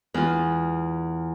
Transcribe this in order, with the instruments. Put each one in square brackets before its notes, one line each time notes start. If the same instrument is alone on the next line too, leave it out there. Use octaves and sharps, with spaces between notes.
[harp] E2 F4